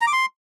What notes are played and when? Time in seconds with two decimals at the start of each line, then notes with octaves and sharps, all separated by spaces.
0.01 A#5
0.07 D6
0.13 C6